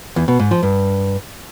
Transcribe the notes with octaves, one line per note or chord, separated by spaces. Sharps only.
E2
B2
G#2
F3
G2